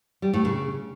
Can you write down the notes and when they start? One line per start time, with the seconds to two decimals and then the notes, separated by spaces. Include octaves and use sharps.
0.22 G3
0.34 A2
0.45 C#3